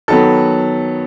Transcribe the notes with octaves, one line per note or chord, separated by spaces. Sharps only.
D#3 F#3 B3 A4